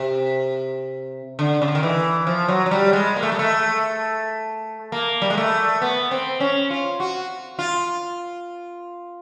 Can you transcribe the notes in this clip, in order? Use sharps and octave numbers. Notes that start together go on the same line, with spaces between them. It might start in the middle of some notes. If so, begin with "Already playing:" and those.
Already playing: C3
D3
C#3
D3
D#3
E3
F3
F#3
F#3
G3
G#3
A#3
A3
G#3
A3
A#3
G3
G#3
A3
B3
C4
C#4
F4
F#4
F4